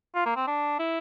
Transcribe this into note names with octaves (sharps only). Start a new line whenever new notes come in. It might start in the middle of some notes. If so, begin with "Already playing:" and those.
F4
A#3
C4
D4
E4